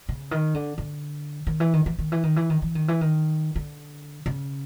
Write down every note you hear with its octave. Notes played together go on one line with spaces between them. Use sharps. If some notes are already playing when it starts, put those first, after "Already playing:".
C#3
D#3
D3
D3
D#3
E3
D#3
E3
D#3
E3
D#3
E3
D#3
E3
D#3
E3
D#3
D3
C#3